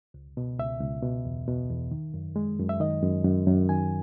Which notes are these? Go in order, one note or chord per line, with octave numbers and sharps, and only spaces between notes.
C#2
B2
C#2 E5
C#2
B2
E2
B2
E2
D#3
F#2
G#3
F#2
E5
D#3 D#5
F#2
F#2
F#2
D#3 G#5